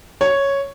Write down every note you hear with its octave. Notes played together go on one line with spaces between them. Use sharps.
C#5